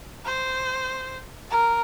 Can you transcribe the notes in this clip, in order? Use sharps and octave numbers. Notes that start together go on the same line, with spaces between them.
C5
A#4